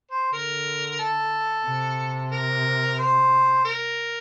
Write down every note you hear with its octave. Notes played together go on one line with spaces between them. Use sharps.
C5
D3 A#4
A4
C3
A#4
C5
A#4